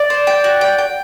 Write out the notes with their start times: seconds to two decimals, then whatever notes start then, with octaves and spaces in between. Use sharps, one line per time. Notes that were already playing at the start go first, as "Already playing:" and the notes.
Already playing: D5
0.10 C5
0.27 G5
0.44 F#4
0.61 G5
0.78 G5